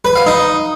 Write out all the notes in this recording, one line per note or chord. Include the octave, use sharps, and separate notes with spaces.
B4
F5
D#4